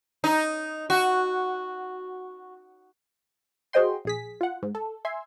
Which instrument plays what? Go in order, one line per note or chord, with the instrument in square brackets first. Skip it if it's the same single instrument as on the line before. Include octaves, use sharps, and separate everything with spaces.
[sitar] D#4
F#4
[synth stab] F#4 G#4 C5 D#5 G5 C6
A#1 G#4 B6
F4 F#5
G#2
A4
E5 G#5 C6